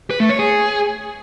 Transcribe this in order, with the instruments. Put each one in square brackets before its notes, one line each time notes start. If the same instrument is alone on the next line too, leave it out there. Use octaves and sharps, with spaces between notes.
[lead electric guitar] B4
A3
C#5
G#4